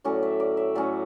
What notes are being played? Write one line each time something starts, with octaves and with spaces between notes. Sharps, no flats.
A2 F#3 C#4 D5
E5
D5
E5
A2 F#3 C#4 D5